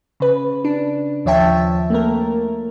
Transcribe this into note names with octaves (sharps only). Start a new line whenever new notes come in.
C#3 B4
D4
D#2 F3 C#5 E5 G5 A5
A3 A#3 A#4